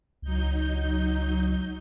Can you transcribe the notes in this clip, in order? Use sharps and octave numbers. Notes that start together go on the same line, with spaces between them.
C#2 F#3 D#4 G6